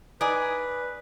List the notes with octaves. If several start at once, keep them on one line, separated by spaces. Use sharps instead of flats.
D#4 G#4 B4 D5